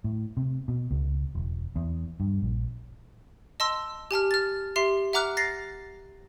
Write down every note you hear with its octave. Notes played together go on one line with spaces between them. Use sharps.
A2
C3
B2
C#2
E1
E2
G2
A#1
D#5 A5 C6 E6
G4 G#5 A5 F6
F6 A6
G4 E5 C6 C7
E5 F#5 A#5 D6 F6 F#6
A6 A#6 C7